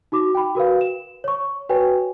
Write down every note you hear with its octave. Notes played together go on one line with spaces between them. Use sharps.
D#4 F#4 D6
G5 B5
F#4 A#4 B4 F5
E7
C#5 C#6
F#4 B4 C#5 G5 G#5